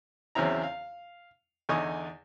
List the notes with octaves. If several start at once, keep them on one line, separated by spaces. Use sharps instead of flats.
E2 C#3 F#3 C4 E4 A#5
F5
E2 D3 D#4 G#5 C#6 D#6